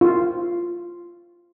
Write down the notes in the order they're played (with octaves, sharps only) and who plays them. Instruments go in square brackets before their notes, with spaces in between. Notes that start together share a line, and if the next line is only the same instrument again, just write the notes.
[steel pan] F4